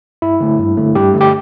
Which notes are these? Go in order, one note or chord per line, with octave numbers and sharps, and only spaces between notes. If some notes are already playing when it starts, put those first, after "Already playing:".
G2 E4
D3 A3
G2
D3 A3
G2 G4
D3 A3
G4